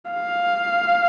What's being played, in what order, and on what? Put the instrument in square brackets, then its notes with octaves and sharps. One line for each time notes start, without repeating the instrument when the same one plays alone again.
[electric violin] F5